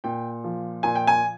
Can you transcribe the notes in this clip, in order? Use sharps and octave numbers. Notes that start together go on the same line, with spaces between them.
A#2 G5
F3
A#2 G#5
G5
G#5